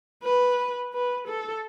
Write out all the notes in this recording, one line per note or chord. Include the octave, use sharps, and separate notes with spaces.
B4
B4
A4